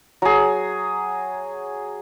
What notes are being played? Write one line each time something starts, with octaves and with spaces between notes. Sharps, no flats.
F#3 G#4